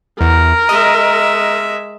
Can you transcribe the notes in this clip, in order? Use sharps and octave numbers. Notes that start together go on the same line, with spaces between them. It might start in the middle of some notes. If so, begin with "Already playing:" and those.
E2 A#4
G#3 D#5 E5